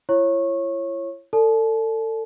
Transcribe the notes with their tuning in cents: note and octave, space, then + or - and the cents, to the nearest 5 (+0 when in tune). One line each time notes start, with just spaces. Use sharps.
E4 +45 C#5 -15 C#6 -20
A4 +30 D5 -15 A5 -40